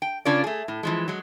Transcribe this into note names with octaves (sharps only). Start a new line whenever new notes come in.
G5
C#3 C#4 D4 F4 A#4 D5
A3 G#4
A2
E3 F3 G#3
F#3 G#3